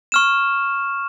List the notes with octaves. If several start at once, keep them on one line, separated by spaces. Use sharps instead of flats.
C#6 F6 E7